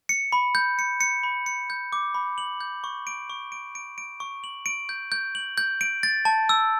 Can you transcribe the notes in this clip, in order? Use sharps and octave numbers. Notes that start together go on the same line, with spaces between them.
C#7
B5
G6
C#7
C#7
B5
C#7
G6
D6
B5
F#7
G6
C#6
D7
C#6
D7
D7
D7
C#6
F#7
D7
G6
G6
F#7
G6
D7
A6
A5
E6